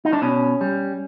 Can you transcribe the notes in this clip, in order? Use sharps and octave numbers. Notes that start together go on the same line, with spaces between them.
D#4
D4
B2 C#4
G3